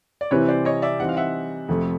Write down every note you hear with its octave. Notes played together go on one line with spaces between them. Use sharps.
D5
C3 E3 G3 C4 E4 B4 C#5
C5 D5
C#5 D#5
D5 E5
E3 G3 C4 D#4 F#5
F5
E5 F#5
F2 C3 F3 A3